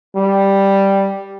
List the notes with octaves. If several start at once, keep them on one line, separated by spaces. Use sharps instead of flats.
G3